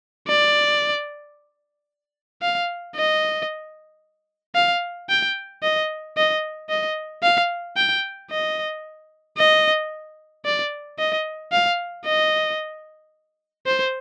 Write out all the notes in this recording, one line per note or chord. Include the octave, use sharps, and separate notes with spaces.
D5
F5
D#5
F5
G5
D#5
D#5
D#5
F5
G5
D#5
D#5
D5
D#5
F5
D#5
C5